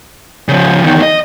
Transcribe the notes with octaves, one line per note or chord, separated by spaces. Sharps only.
C#3 F3
E2 D#3
D#5